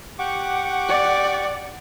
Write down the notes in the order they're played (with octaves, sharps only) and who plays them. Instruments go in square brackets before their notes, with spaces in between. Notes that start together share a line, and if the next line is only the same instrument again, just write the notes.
[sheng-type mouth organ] G4 C#6 D6 [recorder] F#5
[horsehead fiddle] D5